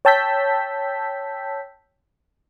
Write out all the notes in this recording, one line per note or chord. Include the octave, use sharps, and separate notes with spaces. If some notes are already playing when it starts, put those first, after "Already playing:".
C#5 G5 A5 E6 G6 B6